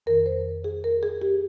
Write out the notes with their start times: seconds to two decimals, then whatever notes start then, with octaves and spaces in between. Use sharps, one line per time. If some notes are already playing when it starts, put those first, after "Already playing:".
0.06 F2 D#3 A#4
0.26 C5
0.64 G#4
0.84 A#4
1.03 G#4
1.22 G4